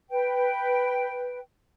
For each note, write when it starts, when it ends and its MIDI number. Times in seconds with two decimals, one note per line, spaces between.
0.10 1.39 71
0.10 1.39 79